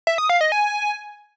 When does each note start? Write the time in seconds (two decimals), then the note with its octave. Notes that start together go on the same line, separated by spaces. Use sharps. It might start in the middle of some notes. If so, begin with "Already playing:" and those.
0.07 E5
0.18 D#6
0.29 F5
0.41 D#5
0.52 G#5